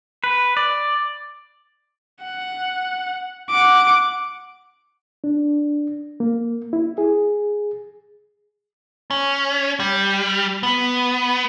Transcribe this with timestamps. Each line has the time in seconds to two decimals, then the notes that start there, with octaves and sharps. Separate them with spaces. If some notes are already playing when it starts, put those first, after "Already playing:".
0.24 B4
0.57 D5
2.24 F#5
3.50 F#5 D6
5.24 D4
6.20 A#3
6.73 E4
6.98 G#4
9.11 C#4
9.80 G3
10.63 B3